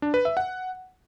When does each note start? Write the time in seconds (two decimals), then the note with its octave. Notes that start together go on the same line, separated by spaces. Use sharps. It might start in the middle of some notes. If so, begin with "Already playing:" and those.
0.02 D4
0.14 B4
0.25 E5
0.37 F#5